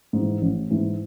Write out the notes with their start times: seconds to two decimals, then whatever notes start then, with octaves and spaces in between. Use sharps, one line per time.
0.13 G#2
0.18 E3
0.42 A1
0.70 G#2 E3